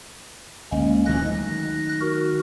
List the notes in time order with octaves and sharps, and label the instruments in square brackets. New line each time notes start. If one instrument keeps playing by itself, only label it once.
[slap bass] D2 [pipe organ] G#3 A#3 C#4
[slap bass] D#3 F#3 A3 [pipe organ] F#6 A#6
[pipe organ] F#4 A#4